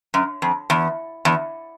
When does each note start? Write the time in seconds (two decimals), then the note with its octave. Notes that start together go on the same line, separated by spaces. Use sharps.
0.14 F#2
0.42 F2
0.70 E2
1.25 E2